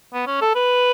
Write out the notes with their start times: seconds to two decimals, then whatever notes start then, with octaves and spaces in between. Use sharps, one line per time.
0.13 B3
0.27 C#4
0.41 A4
0.55 B4